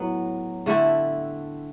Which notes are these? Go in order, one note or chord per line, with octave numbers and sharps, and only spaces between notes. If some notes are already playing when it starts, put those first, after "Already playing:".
Already playing: A2 F#3 B3
D3 A3 E4 G4